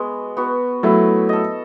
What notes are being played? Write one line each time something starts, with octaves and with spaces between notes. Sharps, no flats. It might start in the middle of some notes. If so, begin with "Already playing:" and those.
Already playing: G#3 B3 F#4
B3 F#4
F#3 A3 E4
A4 D#5